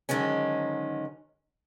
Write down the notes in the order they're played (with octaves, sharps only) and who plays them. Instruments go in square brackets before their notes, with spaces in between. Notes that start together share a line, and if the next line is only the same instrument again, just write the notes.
[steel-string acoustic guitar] G#2 D3 D#3 F#3 G#3 C#4